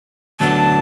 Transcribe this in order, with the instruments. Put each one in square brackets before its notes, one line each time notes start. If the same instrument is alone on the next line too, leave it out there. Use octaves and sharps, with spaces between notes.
[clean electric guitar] D2 D3 F#3 B3 D4 [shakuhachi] A5